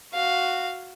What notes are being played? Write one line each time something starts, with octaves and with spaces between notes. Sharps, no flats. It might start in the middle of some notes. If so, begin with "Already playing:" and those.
F#4 F5